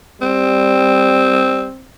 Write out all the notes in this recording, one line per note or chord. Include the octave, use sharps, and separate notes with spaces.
G3 C4